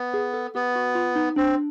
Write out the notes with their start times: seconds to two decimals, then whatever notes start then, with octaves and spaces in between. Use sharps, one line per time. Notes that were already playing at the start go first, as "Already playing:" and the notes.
Already playing: B3
0.14 G#4
0.34 A4
0.55 B3 G4
0.75 F#4
0.95 F4
1.16 D#4
1.36 C4 D4